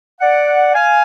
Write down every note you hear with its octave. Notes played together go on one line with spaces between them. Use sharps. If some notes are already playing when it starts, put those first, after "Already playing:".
D5 F#5
F5 G#5